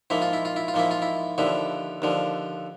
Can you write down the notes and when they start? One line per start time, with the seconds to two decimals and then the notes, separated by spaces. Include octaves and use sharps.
0.10 G#2 F3 A#3 E4
0.22 F4
0.33 E4
0.45 F4
0.56 E4
0.68 F4
0.74 G#2 F3 A#3 E4
0.91 F4
1.02 E4
1.38 D#2 D3 F3 E4
2.02 D#2 D3 F3